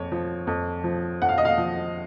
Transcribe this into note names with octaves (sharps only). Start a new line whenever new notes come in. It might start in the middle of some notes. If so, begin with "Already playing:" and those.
Already playing: F2 C#5
F3
F2
F3
F2 F#5
F5
D#5
F5
F3